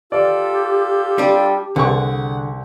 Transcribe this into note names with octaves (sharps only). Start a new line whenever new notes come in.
F4 G4 A4 D5
G3 D4
C2 D3 G#4 F#5 C#6